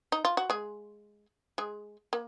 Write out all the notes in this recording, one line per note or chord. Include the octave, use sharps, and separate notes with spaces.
D#4
F4
F#4
G#3 G#4
G#3 G#4
A#3